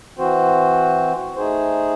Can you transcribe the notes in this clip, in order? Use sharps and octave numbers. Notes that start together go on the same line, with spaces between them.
E3 C4 F#4 C5
A3 D#4 G#4 C5